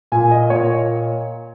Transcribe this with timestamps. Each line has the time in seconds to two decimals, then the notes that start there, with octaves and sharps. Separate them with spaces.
0.12 A#2 G#5
0.31 D#5
0.50 A#2 C#5